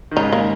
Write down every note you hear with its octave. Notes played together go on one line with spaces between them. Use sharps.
D#3
G#2 C#3 D#4
A#3